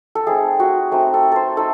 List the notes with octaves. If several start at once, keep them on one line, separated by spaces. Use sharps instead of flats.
A4
A3 C4 D#4 G#4
F#4
A3 C4 D#4
A4
A4 C5
A3 D#4 A4